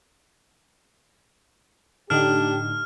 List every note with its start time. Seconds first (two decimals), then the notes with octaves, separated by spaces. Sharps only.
2.10 A2 D3 D4 D#4 G4 F6